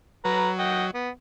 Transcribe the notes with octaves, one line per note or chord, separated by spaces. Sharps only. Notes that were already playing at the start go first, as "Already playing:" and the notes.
F#3 B4 A#5
D#5 F#5 G5
B3